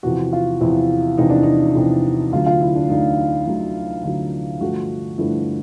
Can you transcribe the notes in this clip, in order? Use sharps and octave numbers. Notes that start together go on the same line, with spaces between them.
E2 C3 F3 F#4
F4
E2 C3 F3 E4
E2 C3 F3 D#4
D4
D#4
E2 C3 F3
D2 D3 F#3 F4
F4
E4
D4
D2 D3 F#3 D#4
D2 D3 F#3 D#4
D2 D3 F#3 F4
G2 D3 F3 A3 F#4
G2 D3 F3 A3 E4